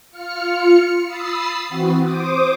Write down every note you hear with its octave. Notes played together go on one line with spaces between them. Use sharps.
F4 F6 C#7
B5 D#6 E6 A6 C7
E3 C4 F#4
C5 D6 D#6